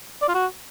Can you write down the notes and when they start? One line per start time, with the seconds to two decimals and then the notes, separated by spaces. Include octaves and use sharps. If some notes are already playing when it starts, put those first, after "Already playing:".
0.22 D5
0.28 F4
0.35 F#4